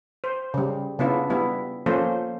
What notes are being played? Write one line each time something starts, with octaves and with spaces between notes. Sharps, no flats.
C5
C#3 G3
C#3 B3 D4 E4 F4
G3 B3 E4
F3 A#3 C#4 A4 C5